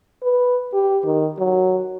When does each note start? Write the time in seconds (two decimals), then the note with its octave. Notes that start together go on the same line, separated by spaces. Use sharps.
0.23 B4
0.73 G4
1.04 D#3
1.39 F#3